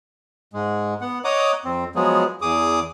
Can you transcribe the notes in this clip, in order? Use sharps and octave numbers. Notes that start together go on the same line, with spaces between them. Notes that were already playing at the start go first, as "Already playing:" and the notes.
G#2 G#3
B3 F#5
C#5 D#5 F#5 A#5 D6 D#6
F2 C4
F3 F#3 G#3 B3 G#4
E2 G#4 D6 D#6